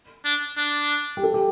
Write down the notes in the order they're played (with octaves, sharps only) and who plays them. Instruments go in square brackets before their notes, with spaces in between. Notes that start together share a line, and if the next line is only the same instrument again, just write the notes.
[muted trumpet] D4
D4
[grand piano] G4
A4
G4